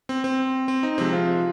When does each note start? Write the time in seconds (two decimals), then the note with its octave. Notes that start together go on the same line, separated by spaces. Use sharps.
0.09 C4
0.24 C4
0.68 C4
0.83 D#4
0.98 C3 F3 G#3 C4
1.13 F4